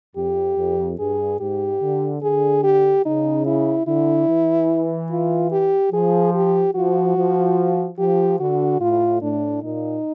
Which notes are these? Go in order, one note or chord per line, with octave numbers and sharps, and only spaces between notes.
F2 G4
F2
G2 G#4
G#2 G4
D3
D3 G#4
G4
C#3 D#4
E4
D3 E4
E3
F4
G4
F3 G#4
G4
F3 F#4
F3
F3 G4
D3 F#4
A2 F4
A2 D4
A#2 D#4